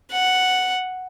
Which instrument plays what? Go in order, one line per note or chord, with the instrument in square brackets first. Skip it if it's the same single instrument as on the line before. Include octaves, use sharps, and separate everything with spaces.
[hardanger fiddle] F#5